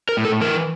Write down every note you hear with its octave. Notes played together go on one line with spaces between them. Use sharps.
A#4
A2
A4
E3 A#4